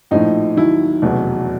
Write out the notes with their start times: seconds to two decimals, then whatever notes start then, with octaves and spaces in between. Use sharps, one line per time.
0.11 A#1 A2 F3 D#4
0.56 D#2 D#3 F#3 E4
1.02 F1 E2 B2 F#3